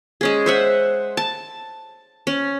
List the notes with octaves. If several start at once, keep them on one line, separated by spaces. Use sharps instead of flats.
G#3 C#4 G#4
C5 E5 F#5
A5
C#4